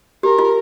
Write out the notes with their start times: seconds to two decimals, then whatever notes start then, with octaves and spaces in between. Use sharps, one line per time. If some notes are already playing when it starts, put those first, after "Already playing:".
0.23 G4 A#4
0.39 F4